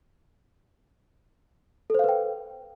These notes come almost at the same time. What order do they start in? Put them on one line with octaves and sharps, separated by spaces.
A4 C5 F5 B4 G5